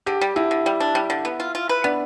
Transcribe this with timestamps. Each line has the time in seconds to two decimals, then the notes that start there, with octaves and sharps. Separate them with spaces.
0.06 D3 G4
0.21 G3
0.36 D3 E4
0.51 D3
0.66 G3
0.80 D4
0.95 G3
1.10 D3
1.25 B3
1.40 F4
1.55 F4
1.69 B4
1.84 B3 D4